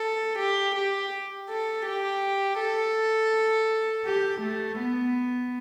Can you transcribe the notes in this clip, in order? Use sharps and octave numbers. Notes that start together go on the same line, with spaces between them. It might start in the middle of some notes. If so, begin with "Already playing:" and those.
Already playing: A4
G4
G4
A4
G4
A4
G4
A3
B3